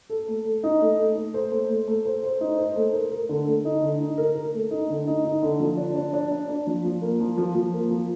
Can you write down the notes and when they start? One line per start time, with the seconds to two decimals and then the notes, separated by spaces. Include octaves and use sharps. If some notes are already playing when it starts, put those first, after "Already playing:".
0.10 A4
0.28 A3
0.45 A3
0.63 D#4
0.81 A3
0.99 A3
1.16 A3
1.34 C5
1.51 A3
1.69 A3
1.87 A3
2.05 C5
2.23 C5
2.41 D#4
2.58 C5
2.76 A3
2.93 A#4
3.12 A#4
3.29 D3
3.47 A3
3.65 D#4
3.82 D3
4.00 D#4
4.18 A#4
4.36 A#4
4.54 A3
4.71 D#4
4.90 D3
5.07 D#4
5.25 D#4
5.43 D3
5.60 F3
5.77 D4
5.95 D4
6.13 D4
6.32 D4
6.49 D4
6.67 F3
6.85 F3
7.02 A#3
7.20 F3
7.38 F3
7.55 F3
7.74 A#3
7.91 F3